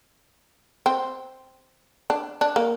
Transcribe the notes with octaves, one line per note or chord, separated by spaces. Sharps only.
C4
D4
D4
A#3